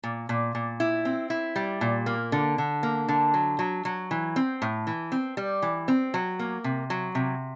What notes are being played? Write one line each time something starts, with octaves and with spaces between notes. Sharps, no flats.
A#2
A#2
A#2
E4
C4
E4
G3
A#2
A#3
D3
D3
A#3
D3
F#3
F#3
F#3
E3
C4
A2
E3
C4
G3
E3
C4
F#3
A#3
C3
F#3
C3